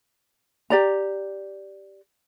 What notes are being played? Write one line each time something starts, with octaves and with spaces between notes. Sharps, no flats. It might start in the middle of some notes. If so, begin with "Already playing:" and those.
G4 D5 A#5